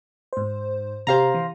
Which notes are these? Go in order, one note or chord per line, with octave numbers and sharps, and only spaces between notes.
G#2 C5
C3 G4 C5 F5 A#5
E3